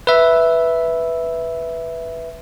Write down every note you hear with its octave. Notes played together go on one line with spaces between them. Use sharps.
B4 E5